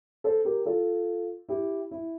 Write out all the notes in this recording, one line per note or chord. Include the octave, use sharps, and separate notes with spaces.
A4 C5
G4 A#4
F4 A4
E4 G4
E4